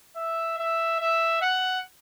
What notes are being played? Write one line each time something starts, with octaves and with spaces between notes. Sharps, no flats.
E5
E5
E5
F#5